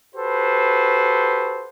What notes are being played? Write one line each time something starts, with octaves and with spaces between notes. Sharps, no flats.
F#4 G4 A4 B4 C5